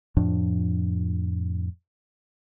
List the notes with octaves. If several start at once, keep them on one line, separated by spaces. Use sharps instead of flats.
F2 A2 F3 D4